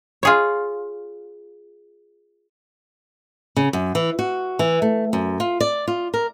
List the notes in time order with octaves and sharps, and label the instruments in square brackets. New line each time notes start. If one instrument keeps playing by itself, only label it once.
[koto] F4 G#4 C#5
[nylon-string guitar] C#3
F#2
E3
F#4
E3
A3
F#2
F4
D5
F4
A#4